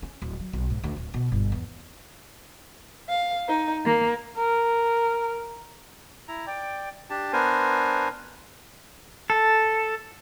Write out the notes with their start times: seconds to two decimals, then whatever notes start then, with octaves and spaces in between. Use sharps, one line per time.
0.02 C#4
0.22 D1
0.40 F#3
0.53 B1
0.70 G#2
0.84 D2
0.97 D1
1.14 B2
1.32 G1
1.52 E2
3.08 F5
3.47 D#4
3.84 A#3
4.37 A#4
6.28 E4 A#5
6.47 D5 G5
7.10 D4 G4 A5
7.33 B3 D4 A#4 C5 G#5
9.30 A4